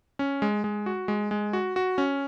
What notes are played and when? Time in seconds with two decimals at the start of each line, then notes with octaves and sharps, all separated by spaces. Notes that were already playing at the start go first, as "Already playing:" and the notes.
0.19 C#4
0.42 G#3
0.64 G#3
0.86 F#4
1.08 G#3
1.31 G#3
1.53 F#4
1.76 F#4
1.98 C#4